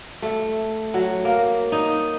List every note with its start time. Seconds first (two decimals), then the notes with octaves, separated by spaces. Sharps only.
0.22 A3
0.94 F#3
1.25 A#3
1.72 D#4